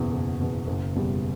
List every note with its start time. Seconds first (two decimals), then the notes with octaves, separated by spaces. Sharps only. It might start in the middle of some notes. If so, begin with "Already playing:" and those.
Already playing: F#1 E2 B2
0.13 F#1
0.41 E2 B2
0.67 F#1
0.95 E2 B2 G3